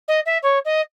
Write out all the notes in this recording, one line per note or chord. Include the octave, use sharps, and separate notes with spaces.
D#5
E5
C#5
D#5